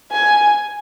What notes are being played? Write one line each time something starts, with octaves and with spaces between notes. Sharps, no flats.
G#5